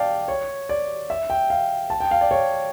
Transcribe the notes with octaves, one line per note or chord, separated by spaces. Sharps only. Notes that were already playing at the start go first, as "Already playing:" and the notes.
Already playing: D5 F5 G5 A5
C#5
D5
E5
G5
F5
A5
G5
F5
D5
C#5